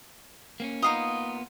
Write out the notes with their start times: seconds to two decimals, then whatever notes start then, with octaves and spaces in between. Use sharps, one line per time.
0.60 A#3 C4 C#4
0.82 A#3 B3 D#4 F4 F5 D#6